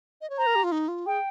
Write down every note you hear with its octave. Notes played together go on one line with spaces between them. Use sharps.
D#5
C#5
C5 A#5
A#4
G4
F4
D#4
F4
G#4 G5